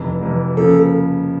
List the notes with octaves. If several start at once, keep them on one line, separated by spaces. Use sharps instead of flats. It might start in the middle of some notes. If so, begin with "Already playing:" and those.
Already playing: F1 F2 C3 E3
F1 F2 C3 E3
C#3 F3 A#3 A4